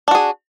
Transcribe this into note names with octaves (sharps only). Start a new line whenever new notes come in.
D4 F#4 G#4